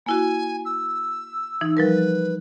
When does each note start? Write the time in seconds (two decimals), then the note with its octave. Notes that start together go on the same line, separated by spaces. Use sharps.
0.06 A#3 E4 F#4 G#5
0.65 E6
1.61 E3 D#4
1.77 F3 G3 A#4 B4